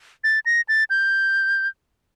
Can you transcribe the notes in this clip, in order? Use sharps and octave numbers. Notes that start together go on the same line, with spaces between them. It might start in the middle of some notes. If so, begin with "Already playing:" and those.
A6
A#6
A6
G6